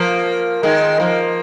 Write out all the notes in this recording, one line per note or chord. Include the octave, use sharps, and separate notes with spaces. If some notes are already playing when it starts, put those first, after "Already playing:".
Already playing: F3 A#3
D#3 G#3
F3 A#3